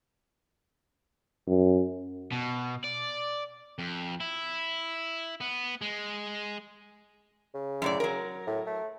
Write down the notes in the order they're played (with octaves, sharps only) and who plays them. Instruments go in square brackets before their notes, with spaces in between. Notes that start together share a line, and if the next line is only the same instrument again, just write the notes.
[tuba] F#2
[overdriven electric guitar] B2
D5
[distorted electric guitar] F2
E4
B3
G#3
[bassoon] C#3
[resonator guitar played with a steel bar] F#2 A2 D5
F#3 A#4
[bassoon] A2
A3